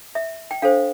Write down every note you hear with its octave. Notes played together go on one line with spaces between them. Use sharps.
E5
G5
D4 A4 C5 F5